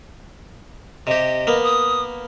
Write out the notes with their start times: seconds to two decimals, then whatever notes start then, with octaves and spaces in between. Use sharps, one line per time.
1.07 C3 G4 D#5
1.47 A#3 B3
1.64 D#6